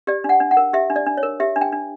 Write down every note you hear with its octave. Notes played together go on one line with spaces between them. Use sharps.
G4 D5
D4
F#5
D4
F#5
A#4
G4 E5
D4
D5
D4
C#5
A#4
G4 E5
D4
G5
D4